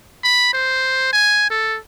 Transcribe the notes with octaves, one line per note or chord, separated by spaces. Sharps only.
B5
C5
G#5
A4